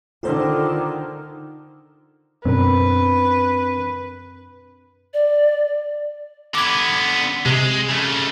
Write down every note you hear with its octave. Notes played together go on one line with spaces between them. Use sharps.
D3 D#3 F4 A4 C5
F#2 B2 C4 D4 A#4 B4
D5
D3 B3 D6 G#6
C3 G#3
C#3 A3